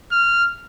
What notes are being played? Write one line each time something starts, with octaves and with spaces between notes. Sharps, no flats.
F6